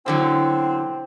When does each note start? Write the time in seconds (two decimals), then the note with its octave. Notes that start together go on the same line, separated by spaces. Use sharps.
0.06 B2 D3 F#3 C4 E4